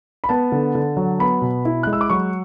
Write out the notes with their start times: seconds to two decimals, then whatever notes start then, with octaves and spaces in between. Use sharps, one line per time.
0.24 B5
0.29 B3 A5
0.52 D3
0.75 D3
0.97 F#3
1.19 B3 B5
1.42 B2
1.65 E4
1.83 G#3 F#6
1.93 E6
2.01 D6
2.10 F#3 C#6